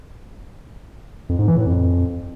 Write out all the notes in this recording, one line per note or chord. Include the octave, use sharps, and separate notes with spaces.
F2
G#2
E3
A2
F2